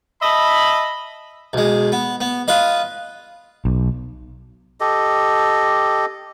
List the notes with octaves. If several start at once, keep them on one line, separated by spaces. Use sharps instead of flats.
D#5 E5 A5 B5
B1 G#3
B3
B3
F4 B4 D#5
B1
G4 A4 D#5